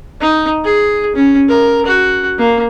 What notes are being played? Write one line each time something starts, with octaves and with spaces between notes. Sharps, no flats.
D#4
G#4
C#4
A#4
F#4
A#3